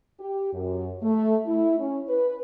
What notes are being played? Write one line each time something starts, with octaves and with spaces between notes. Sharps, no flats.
G4
F#2
A3
E4
C#4
B4